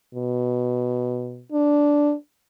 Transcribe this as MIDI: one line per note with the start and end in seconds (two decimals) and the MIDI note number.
0.15 1.43 47
1.52 2.13 62